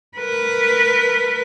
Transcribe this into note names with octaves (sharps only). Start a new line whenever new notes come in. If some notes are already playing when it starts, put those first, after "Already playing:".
A#4 B4